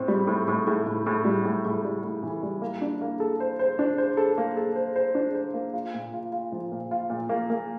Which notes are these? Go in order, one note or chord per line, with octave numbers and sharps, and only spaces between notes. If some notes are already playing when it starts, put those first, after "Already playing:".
Already playing: A2 C4
G3
A2
A2
A2
A2
A2
G3
A2
A2
G3
A2
E3
G3
A#3
D4
A#3
A4
C5
C5
D4
C5
A4
A#3
A4
C5
C5
D4
C5
A#3
F4
A#2
F4
F4
F3
A#2
F4
A#2
A#3
A#3